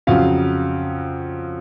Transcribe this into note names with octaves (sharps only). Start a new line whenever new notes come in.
F2 C#3 F#3 F5